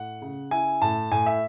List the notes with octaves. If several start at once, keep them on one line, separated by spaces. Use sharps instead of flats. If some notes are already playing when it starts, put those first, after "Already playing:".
Already playing: A2 F#5
C#3
E4 G#5
A2 A5
A2 G#5
E5